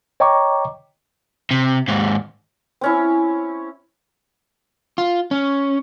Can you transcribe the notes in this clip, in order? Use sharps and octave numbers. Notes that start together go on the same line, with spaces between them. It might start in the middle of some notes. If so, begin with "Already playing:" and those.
C#5 D#5 G5 A#5 C#6 D6
C3
D#2 G#2
C4 C#4 E4
F4
C#4